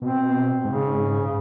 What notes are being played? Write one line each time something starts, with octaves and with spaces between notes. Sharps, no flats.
B2 C4
G#2 C#3